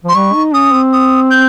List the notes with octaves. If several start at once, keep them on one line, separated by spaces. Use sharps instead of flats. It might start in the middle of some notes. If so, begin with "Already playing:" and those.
F3 C6
G3 C#6
D#4
C#4 D#6
C4
D#6
G6